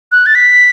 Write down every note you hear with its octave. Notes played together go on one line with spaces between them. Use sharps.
F#6
A6
B6